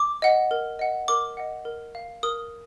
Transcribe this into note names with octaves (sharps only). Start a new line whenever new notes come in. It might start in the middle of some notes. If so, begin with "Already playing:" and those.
Already playing: D6
D#5 F#5
A#4
D#5 F#5
A#4 D6
D#5 F#5
A#4
F5
A#4 D#6